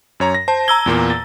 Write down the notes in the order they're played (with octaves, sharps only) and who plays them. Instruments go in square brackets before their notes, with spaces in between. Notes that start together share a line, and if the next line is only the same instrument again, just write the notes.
[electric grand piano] F#2 C#5 A#5
A#6
[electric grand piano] C5 [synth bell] A5
[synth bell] A#5 E6 G7 [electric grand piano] G#6
[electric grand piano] E2 A#2 A#3
A6